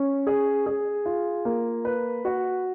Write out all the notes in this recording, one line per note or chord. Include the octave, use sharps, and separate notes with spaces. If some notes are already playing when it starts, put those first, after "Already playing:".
Already playing: C#4
G#4
G#4
F4
A#3
B4
F#4